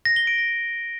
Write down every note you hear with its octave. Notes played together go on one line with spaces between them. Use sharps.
A#6
G7
D7
A#6